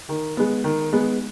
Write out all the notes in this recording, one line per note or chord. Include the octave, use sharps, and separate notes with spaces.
D#3
G#3 B3
D#3
G#3 B3